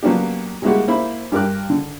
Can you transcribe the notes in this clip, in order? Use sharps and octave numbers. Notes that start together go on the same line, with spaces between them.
F#3 A#3 B3 C#4 D4 G4
G3 G#3 A#3 E4 F#4 G4
A#3 E4 C5 B5
G2 G4 A#4 D6 F#6
D3